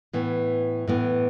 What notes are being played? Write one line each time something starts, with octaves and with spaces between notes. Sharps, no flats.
A2 E3 B3
A2 E3 B3